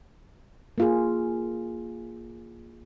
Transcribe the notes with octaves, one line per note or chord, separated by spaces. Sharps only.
A#3 F4 G#4